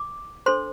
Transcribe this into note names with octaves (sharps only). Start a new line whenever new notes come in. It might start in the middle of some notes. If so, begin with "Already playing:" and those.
Already playing: D6
D4 A4 C5 C6